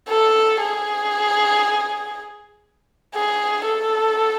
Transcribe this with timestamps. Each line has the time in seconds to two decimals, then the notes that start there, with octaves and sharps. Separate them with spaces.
0.08 A4
0.61 G#4
3.15 G#4
3.65 A4